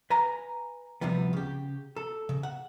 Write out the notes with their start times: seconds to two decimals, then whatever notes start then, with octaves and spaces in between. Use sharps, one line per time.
0.10 B4 G#5 A#5
1.01 D2 C3 F3 G3 B3
1.33 C#3 G4
1.97 A4
2.29 C#3
2.43 F#5